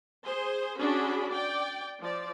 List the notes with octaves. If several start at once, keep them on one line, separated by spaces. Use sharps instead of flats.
G#4 C5 C6
C#4 D4 F#4 G#4 B5
D5 G5
F3 D5